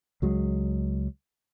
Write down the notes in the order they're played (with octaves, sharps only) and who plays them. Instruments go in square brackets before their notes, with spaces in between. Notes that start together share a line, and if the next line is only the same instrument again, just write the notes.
[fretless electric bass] C#2 F#3 G#3